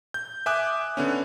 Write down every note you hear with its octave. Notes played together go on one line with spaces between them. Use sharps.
G6
E5 G#5 D6 D#6 F#6
D3 B3 C#4